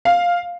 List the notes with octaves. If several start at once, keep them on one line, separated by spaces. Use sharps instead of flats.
F5